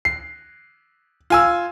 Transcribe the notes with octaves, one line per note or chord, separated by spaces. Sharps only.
C7
F4 G#5 E6